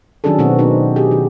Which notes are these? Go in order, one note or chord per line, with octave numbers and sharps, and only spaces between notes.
D#3 F#3 C#4 D4 G#4 A4
B2 D#3 B3 C4 F#4
C4 D#4
G4 G#4
D#3